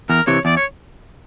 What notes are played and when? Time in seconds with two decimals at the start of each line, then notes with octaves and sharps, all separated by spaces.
0.09 E2 A#4
0.27 C3 E3 C#5
0.45 E2 D5
0.57 C#5